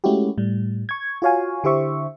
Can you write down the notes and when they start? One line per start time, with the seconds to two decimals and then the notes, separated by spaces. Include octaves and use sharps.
0.04 G#3 A3 C#4 E4 F#4 G4
0.38 A2 G3
0.89 C#6 G#6
1.22 F4 F#4 C#5 F5 G#5
1.64 D3 E4 G4 C5 E5 C#6